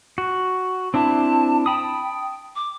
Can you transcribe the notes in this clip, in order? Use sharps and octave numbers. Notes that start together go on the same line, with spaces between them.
F#4
C4 D4 E4 A5
G5 A5 B5 D#6
D6